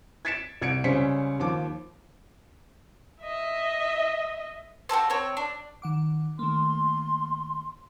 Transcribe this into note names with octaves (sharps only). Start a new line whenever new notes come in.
G#6 A6 B6 C#7 D7 E7
C2 G#6 C#7 D7
C#2 G3 C#4 C5 B6 C#7
D#2 F3 D6
D#5 E5
F#4 G4 A4 C5
C4 C#5
D4
D#3 F#5 D6
D#3 A3 A#3 C6